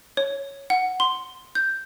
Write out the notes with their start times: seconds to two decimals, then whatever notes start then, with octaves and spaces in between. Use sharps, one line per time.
0.17 C#5
0.70 F#5
1.00 C6
1.55 G6